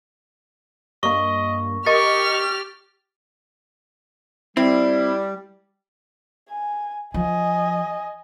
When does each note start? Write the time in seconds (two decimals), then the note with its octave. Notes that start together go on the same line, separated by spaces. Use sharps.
1.03 G2 A#3 D#5 C#6
1.87 G4 A#4 D#5 C#6 F6 A6
4.57 G3 C4 E4
6.50 G#5
7.14 F3 D#5 G#5